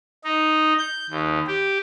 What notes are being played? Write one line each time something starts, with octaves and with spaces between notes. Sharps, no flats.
D#4
G6
D#2
G4